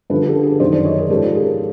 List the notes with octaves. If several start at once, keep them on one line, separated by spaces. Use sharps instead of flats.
G2 D3 F3 A4 B4
G4 A4
G#4
F#2 D#3 C5 D5
C5 D5
C#5 D#5
G#4 A#4
G#2 F3 G4 A4
G#4 A#4